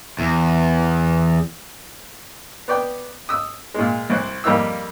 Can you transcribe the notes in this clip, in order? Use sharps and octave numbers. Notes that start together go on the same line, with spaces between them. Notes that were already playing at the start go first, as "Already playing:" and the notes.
E2
B3 D5 G5
D#6 E6
A#2 G#3
C2 C4 F#6
F2 G3 A#3 D#4 E6